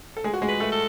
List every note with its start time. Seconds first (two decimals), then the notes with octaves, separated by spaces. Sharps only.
0.17 A4
0.24 G#3 G#4
0.33 F#4
0.42 G#3 G#4
0.49 B4
0.60 A3 A4
0.72 A4